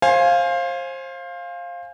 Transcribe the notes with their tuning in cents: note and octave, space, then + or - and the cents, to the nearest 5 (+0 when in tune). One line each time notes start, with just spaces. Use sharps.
C5 +30 F5 +0 G#5 +0